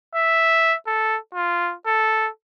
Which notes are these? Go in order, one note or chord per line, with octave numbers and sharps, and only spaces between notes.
E5
A4
F4
A4